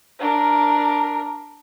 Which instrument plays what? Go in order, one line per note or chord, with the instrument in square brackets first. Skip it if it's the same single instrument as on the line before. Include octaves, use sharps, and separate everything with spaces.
[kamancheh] D4 A#4